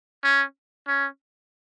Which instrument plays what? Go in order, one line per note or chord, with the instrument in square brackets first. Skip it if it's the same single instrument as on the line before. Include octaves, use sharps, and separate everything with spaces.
[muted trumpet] C#4
C#4